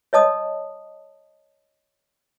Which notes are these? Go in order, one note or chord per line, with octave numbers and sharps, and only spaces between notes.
C#5 D#5 A5 D#6